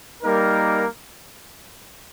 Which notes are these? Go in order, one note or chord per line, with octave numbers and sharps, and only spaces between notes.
G3 A#3 D#4 A#4